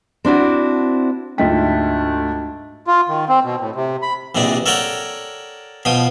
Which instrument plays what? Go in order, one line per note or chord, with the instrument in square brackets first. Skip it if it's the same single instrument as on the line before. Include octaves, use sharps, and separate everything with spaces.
[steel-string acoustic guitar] C4 D4 E4 F#4
[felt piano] D2 G#2 B6 [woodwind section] A3 D4 [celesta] F4 D#5 G5
[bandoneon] F4
D#3
C4
B2
A2
C3
B5
[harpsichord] A#1 C3 E3 G#3 D5
A4 A#4 C#5 D5 F#5 G5
B2 F3 G5 D#6